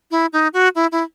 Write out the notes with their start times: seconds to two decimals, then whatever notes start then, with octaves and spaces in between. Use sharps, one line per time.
0.11 E4
0.33 D#4
0.53 F#4
0.75 E4
0.92 E4